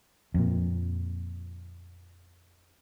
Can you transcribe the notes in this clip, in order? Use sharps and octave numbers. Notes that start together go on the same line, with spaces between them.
F2 A#2